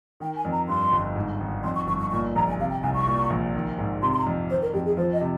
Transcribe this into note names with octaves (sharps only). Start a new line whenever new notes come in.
D#3 G5
G#5
F2
A#5
G2 C6
G1
G#2
G#1
F2 C6
C#6
G1 C#6
C#6
A#2 C#6
A#1 A#5
G#5
C3 F5
G5
C2 G#5
C#6
A#2
A#1
D#3
G#2
C3 C6
C6
A#5
F2
D#3 C5
A#4
F2 G4
G#4
F3 C5
D#5
C3